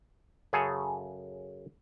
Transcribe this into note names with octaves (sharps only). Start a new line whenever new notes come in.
F#2 C#3 G#4 A4 C#5